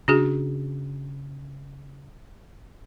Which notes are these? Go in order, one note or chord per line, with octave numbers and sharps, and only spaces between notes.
C#3 D4 F#4 G#4